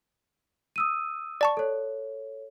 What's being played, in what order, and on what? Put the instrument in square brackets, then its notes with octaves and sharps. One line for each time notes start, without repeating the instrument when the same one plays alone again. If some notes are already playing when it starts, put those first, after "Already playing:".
[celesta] D#6 E6 D#7
[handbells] D5 A5 C#6
[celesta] A4 C#5